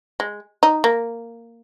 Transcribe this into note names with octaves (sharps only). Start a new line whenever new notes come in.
G#3
D#4
A#3